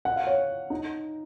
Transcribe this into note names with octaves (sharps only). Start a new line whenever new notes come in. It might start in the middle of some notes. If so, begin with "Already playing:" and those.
F#5
F5
C#5
D#4